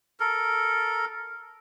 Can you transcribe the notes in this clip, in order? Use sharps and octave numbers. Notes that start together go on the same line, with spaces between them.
A4 A#4